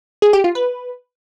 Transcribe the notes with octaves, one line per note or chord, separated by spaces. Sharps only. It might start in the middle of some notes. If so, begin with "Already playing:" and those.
G#4
G4
F4
B4